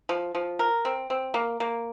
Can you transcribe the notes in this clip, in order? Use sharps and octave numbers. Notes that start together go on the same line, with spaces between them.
F3
F3
A#4
C4
C4
A#3
A#3